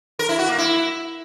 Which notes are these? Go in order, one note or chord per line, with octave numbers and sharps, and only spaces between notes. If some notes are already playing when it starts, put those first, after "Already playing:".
A#4
E4
F#4
A#3
E4